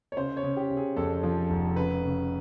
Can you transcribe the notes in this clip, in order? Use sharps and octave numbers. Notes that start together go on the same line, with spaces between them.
C#5
C#3 C5
C#5
C#3
G4
C#3
G#4
F2 A4
F3
F1
C#3 B4
C#3